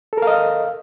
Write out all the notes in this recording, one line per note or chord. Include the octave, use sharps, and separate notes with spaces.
A4 A#4 D#5 F5